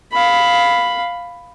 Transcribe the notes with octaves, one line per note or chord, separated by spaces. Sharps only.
F5 B5